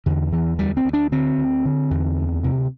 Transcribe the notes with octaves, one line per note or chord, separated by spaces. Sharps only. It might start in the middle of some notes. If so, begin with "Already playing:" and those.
E2 D3
E2 E3
D2 G3
C4
D2
D4
D3 C4
D2
D3
E2
D2
C3